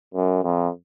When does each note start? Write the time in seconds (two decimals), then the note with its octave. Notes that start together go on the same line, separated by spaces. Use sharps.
0.14 F#2
0.43 F2